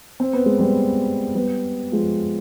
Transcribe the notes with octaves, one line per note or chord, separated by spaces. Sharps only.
C4
B3
G#3
G3 B3
G3 B3
F3 G#3